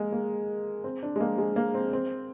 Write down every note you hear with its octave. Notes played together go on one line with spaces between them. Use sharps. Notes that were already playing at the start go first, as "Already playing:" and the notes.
Already playing: G#3 A#3
A#3
C4
D4
G#3
A#3
G#3
A#3
C4
C4